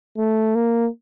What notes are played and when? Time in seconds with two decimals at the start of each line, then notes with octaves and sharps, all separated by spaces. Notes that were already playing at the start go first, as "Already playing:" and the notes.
0.18 A3
0.55 A#3